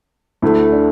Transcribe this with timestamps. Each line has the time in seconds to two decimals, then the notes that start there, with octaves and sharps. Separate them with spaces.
0.42 D2 D3 A3 E4
0.72 D4